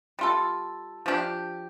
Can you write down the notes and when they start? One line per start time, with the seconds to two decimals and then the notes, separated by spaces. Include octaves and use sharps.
0.19 G3 F4 A4
1.06 F3 D4 G4